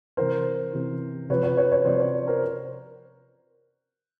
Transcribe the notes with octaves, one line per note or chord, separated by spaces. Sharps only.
C3 E3 A#4 C5
C3 E3
C3 F3 B4 C#5
B4 C#5
B4 C#5
B4 C#5
C3 F3 C5 D5
C5 D5
A#4 C5